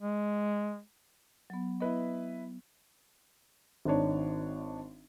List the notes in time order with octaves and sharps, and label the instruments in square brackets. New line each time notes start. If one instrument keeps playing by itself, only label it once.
[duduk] G#3
[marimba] F#3 B3
[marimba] B3 [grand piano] E4 B4 D#5
[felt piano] G#1 D#3 D4 C#5